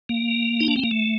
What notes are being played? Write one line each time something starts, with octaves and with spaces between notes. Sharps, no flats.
A#3
D#4
D4
C4
A#3
A3